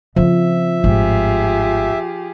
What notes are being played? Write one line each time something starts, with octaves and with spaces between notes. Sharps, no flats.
C#3 F3 C4 E5
G#1 A2 F4 G4 G#4